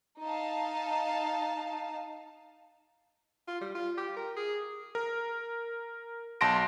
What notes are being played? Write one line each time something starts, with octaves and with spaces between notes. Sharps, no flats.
D#4 F5 A5
F4
G3
F4
G4
A#4
G#4
A#4
B1 A5 C6 A#6 D7